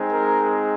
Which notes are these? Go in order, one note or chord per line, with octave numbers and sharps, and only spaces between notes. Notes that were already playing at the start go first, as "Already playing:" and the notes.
Already playing: G#3 C4 D#4
A#4